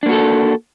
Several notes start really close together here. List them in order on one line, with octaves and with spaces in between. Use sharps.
D4 A#3 F#4 A4